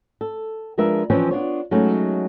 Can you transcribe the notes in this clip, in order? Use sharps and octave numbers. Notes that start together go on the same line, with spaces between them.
A4
F3 G#3 D4 A#4 B4 E5
E3 F3 C4 C#4 B4 C#5
B3 D4 F4 C#5
F#3 G#3 A3 C#4 D#4